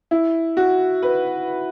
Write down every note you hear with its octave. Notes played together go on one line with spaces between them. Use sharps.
E4
F#4
B4